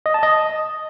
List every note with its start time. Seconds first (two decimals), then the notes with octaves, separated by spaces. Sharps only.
0.06 D#5
0.14 A5
0.23 D#5